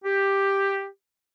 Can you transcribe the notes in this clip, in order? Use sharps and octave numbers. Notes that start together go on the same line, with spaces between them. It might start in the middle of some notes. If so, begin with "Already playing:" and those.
G4